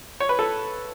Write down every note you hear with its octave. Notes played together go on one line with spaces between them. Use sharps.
C#5
B4
A4